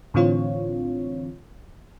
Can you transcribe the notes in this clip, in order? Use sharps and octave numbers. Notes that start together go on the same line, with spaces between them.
A2 D3 E3 C4 F4 C#5